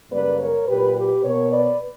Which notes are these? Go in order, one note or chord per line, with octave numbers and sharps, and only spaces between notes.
F#2 C#3 G3 A#3 B4 D5
A#4 C#5
A#2 F#3 A#3 G4 B4
G4 B4
B2 A#3 A#4 C#5
B4 D5